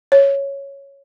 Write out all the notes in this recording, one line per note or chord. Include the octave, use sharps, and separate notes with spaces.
C#5